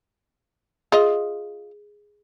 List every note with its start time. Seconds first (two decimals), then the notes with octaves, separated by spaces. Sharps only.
0.92 F4 G#4 D#5